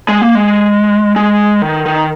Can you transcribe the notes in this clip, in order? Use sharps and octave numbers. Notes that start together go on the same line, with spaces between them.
G#3
A#3
G#3
G#3
D#3
D#3